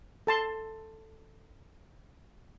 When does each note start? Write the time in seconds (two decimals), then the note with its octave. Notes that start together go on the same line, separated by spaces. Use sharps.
0.27 A4 A5 C6